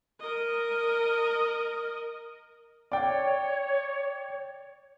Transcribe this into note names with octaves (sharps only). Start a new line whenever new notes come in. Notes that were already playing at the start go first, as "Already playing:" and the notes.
A#4 D#5
C#5 D5 G5